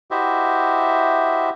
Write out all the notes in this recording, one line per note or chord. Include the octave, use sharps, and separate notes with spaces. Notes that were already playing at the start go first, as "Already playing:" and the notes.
E4 F#4 G4 C5 D#5 E5